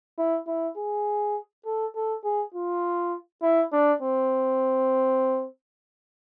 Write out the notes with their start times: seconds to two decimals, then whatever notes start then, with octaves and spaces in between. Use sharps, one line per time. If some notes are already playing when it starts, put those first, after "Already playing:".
0.18 E4
0.47 E4
0.77 G#4
1.66 A4
1.95 A4
2.24 G#4
2.54 F4
3.42 E4
3.72 D4
4.02 C4